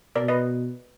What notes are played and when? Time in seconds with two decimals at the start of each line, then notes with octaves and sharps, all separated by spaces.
0.15 B2 A#4 D5
0.28 B4 D#5